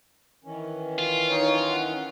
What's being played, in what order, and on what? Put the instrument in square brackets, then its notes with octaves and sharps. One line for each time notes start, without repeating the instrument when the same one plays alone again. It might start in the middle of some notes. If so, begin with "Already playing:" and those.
[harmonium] D#3 E3 C#4
[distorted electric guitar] F4
[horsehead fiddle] D#4 C#5
F#5